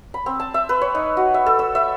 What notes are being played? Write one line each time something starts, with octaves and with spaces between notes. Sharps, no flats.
B5
C4
A5
E5
B4
C#5
D#4
F#4
E5
A4
E6
E5